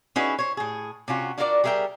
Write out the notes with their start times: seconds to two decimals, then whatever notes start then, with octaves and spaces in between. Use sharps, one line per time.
0.16 C#4 D#4 E4 F#4 G#4 B4
0.39 C5 C#5
0.57 A2 G#4
1.08 C3 C#4 F4 F#4
1.38 D4 F4 F#4 A#4 C#5 D5
1.64 G3 G#4 A#4 E5 G5